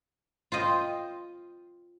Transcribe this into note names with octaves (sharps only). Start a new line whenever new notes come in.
F4 C5 D#5 G5